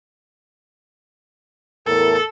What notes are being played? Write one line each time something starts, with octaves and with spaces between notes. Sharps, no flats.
E2 A2 A4 A#4